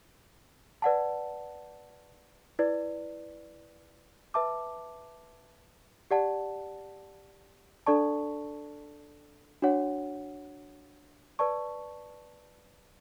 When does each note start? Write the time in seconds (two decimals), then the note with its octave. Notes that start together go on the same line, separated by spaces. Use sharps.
0.82 B4 D5 F#5 A5
2.59 E4 B4 D5
4.34 B4 E5 A5 D6
6.11 G4 D5 F#5 A5
7.86 D4 A4 D5 A5 C#6
9.62 D4 F#4 C#5 F#5
11.39 B4 D5 A5 C#6